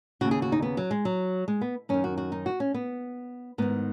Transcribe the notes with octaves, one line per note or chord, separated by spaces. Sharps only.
D#2 C#3 F#4
G#4
F#4
D#4
B3
F#3
G#3
F#3
G#3
B3
F#2 D#3 C#4
F#4
F#4
D#4
F#4
C#4
B3
G#2 D#3 B3